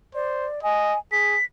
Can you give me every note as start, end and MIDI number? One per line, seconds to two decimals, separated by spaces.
0.15 0.47 72
0.15 0.60 74
0.63 0.95 75
0.63 0.98 80
1.12 1.36 68
1.12 1.45 95